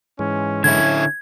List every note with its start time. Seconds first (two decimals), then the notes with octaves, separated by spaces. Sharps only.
0.19 G#2 E3 G#3 C#4
0.64 D3 C#4 E4 G#6